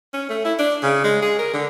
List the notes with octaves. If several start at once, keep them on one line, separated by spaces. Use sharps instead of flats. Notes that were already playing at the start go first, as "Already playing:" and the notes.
C#4
A3
E4
D4
C#3
G#3
G#4
A#4
D3